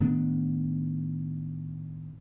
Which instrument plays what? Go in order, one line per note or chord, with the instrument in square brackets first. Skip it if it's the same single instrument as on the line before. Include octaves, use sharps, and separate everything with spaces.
[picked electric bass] A2 D#3 B3 D4